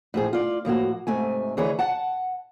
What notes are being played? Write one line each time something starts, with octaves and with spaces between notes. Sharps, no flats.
A2 F3 G#4
F4 D5
A2 F3 A#3 F#4
G#2 C3 A3 G#5
D2 E3 G#4 B4 C#5
F#5 A5